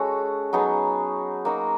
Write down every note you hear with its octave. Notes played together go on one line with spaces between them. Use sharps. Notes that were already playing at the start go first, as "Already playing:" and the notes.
Already playing: G#3 C#4 F#4 A4
F#3 B3 D#4 G#4
A#3 D#4 F#4